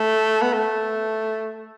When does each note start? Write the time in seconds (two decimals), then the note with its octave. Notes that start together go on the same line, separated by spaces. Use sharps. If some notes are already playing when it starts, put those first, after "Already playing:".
Already playing: A3
0.42 B3
0.53 A3